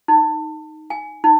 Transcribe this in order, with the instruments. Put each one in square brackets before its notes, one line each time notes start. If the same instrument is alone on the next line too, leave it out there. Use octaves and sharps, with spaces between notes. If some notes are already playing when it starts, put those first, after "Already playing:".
[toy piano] D#4
G#5
D#4